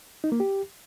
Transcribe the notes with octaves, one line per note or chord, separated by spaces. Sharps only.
D#4
A#3
G4